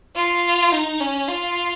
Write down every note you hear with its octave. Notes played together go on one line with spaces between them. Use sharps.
F4
D#4
C#4
F4